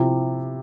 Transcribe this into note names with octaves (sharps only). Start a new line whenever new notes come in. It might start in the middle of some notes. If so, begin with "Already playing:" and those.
Already playing: C3 F3 C4 E4 G4